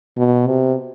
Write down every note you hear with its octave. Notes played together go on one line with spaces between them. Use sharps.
B2
C3